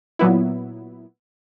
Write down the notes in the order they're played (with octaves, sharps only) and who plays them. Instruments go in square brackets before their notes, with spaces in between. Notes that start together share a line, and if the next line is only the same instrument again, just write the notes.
[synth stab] A#2 F#3 B3 E4